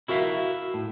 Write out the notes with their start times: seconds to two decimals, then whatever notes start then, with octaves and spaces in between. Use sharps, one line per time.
0.08 E4 F#4 A#4 E5 F5
0.74 A2